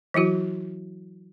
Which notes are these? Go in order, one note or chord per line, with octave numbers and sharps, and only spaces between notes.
E3 F#3 E4 F#4